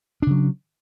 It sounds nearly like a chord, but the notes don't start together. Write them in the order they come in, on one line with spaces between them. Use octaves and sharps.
D4 C#3 F#3